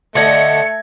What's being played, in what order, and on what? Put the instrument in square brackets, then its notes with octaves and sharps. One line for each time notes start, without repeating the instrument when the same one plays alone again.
[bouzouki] D3 D#5 [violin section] A3 C#7 [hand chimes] E5 G#6